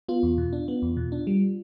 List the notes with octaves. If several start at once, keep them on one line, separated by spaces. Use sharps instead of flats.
B3 F4
E2
B2
D4
B3
E2
B2
D4
G3